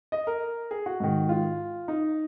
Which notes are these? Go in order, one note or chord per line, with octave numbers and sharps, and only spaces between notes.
D#5
A#4
G#4
F#4
G#2 D#3
F4
D#4